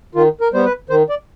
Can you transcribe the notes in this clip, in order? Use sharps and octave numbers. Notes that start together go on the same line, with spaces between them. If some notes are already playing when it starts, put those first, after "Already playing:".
D#3 F4
A#4
G3 B3 C5
B4
D#3 C5
D5